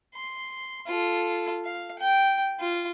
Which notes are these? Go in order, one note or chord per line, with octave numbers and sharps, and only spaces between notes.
C6
F4 A4
F5
G5
F4